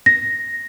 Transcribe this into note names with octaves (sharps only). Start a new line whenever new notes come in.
A#6